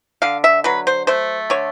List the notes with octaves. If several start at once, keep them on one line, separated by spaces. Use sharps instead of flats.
D3 F5
E5
F#3 B4
C5
A3 C5
D3 C#5